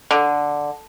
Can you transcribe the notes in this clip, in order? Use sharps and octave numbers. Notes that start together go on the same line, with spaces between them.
D3